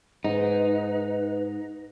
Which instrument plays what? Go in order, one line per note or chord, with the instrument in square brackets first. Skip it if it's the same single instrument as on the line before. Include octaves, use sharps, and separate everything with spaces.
[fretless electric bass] G#2 [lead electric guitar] D#4 [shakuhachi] B4